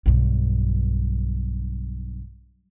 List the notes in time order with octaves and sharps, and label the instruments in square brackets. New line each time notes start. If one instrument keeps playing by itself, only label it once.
[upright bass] B1 G2